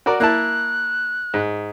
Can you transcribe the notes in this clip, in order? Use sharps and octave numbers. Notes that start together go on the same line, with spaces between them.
F#4 A#4 D5
A#3 E4 A5 F#6
G#2